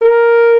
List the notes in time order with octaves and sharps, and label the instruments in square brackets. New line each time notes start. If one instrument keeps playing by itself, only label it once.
[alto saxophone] A#4